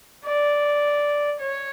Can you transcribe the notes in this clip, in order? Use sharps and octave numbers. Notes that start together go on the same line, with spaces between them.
D5
C#5